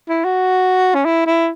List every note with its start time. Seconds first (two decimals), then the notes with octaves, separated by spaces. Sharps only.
0.09 E4
0.24 F#4
0.95 C#4
1.05 E4
1.26 E4